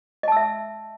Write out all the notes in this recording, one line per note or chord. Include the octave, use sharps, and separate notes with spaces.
D#5 E5 A5 E6